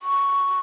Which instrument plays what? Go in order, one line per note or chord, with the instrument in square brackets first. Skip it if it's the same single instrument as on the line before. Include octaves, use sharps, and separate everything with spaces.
[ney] C#6